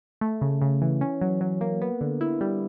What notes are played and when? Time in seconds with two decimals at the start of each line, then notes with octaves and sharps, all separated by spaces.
0.21 A3
0.41 C#3
0.62 C#3
0.82 E3
1.01 C#4
1.21 F#3
1.41 F#3
1.61 A#3
1.81 B3
2.01 D3
2.21 E4
2.41 G3